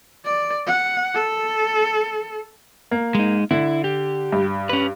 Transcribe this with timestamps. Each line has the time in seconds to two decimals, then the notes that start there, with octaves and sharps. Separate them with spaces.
0.25 D5
0.67 F#5
1.15 A4
2.91 A#3
3.15 G#3 D#4
3.51 D3 E4
3.84 G4
4.32 G2
4.69 C#4 B4